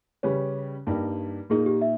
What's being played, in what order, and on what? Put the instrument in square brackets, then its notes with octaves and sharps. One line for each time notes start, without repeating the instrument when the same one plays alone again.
[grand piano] C#3 G3 C#4 G4 B4 [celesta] C#5
[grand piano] G2 G3 A#3 D#4
[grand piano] A#2 A#3 D#4 [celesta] G#4
[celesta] G4
E5